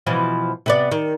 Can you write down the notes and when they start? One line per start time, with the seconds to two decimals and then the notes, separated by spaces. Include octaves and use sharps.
0.07 B2 E3 F3
0.66 C3 B3 D5
0.91 D#3